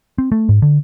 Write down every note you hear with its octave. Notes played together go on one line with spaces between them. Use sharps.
C4
A3
G#2
D3